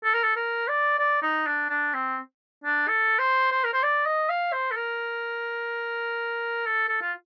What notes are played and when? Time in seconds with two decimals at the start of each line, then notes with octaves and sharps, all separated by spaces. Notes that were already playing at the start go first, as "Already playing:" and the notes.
0.04 A4
0.14 A#4
0.23 A4
0.36 A#4
0.68 D5
0.99 D5
1.22 D#4
1.47 D4
1.70 D4
1.94 C4
2.64 D4
2.88 A4
3.19 C5
3.51 C5
3.64 A#4
3.74 C5
3.83 D5
4.06 D#5
4.29 F5
4.53 C5
4.71 A4
4.77 A#4
6.66 A4
6.89 A4
7.02 F4